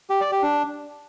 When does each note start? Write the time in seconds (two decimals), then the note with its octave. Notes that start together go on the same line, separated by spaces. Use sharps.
0.10 G4
0.21 D5
0.32 G4
0.43 D4